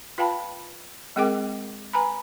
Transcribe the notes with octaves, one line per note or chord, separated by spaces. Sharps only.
F4 B4 F5 G5 A5 B5
G#3 C4 G#4 A#4 G5 D6
B4 G#5 A#5 B5